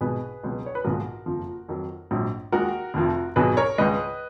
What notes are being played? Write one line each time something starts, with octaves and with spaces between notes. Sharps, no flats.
B1 B2 G#3 G#4 B4
C#2 B2 F#3
C#5
B4
B1 A#2 F3 G#3 F#4 A#4
F#1 F2 F3
F2 D#3 F#3
A#1 G#2 F#3
D#2 D#3 G#3 F#4 A#4
F1 F2 F3
B1 B2 F#3 G#4 B4
A#4 C#5
C#2 C#3 G#3 B4 D#5